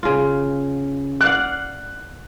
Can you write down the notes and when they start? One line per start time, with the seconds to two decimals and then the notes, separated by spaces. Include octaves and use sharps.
0.03 C#3 F4
1.21 D5 F5 F#5 F#6